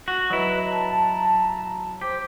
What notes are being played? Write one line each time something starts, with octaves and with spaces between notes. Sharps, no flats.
F#4
F#3 E4 B4 D#5 A#5
A5 A#5
G4 C5 D6